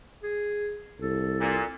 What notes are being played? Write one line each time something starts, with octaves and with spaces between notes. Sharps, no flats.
G#4
C2 A4
A#2